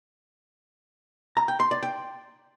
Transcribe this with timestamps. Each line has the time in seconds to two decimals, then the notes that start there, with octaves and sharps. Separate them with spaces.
1.37 A#5
1.48 G5
1.60 C6
1.71 D5
1.83 G5